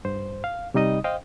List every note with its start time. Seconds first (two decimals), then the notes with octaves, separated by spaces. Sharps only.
0.05 G2 C5
0.44 F5
0.74 C3 G3 D#4 D#5 D#6
1.04 C5 D#5 F5 G5